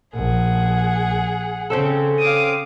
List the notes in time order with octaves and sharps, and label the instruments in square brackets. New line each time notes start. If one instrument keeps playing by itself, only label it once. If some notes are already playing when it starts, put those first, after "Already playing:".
[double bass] A#1 [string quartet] G#4 F#5
[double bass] C#3 [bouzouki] C4 C#4 A4
[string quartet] F5 D6 D#6